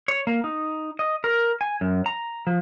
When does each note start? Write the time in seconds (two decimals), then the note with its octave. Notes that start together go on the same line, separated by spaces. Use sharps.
0.08 C#5
0.27 A#3
0.44 D#4
0.99 D#5
1.24 A#4
1.61 G#5
1.81 F#2
2.06 A#5
2.47 F3